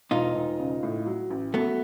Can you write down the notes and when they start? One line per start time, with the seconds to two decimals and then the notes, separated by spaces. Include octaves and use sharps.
0.11 E1 D#4 F4
0.35 E1
0.59 C#3
0.83 A2
1.06 F#3
1.30 A1
1.54 F#3 A3 B3